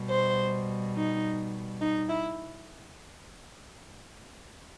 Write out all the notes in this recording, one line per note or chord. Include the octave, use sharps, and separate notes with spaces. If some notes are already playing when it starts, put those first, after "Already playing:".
Already playing: B2 G3
C5
D#4
D#4
E4